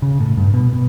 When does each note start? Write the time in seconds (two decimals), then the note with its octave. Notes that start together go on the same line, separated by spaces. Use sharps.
0.02 C#3
0.20 A2
0.37 G2
0.54 B2
0.73 B2